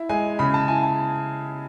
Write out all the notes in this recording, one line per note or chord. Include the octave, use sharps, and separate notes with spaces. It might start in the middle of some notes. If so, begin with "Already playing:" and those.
Already playing: E4
G#3 G#5
C#3 B5
A5
E4 G#5
A5